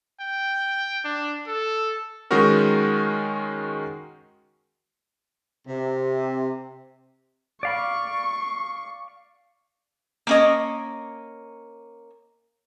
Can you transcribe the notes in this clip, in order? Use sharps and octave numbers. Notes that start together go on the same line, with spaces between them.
G5
D4
A4
D#3 G#3 C#4 D#4 F#4 A#4
C3
D5 F5 B5 C#6
A#3 C#4 D#5